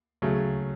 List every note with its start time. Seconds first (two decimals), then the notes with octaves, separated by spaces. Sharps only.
0.22 C#3 F#3 A3